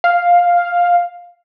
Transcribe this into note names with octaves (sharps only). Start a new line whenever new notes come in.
F5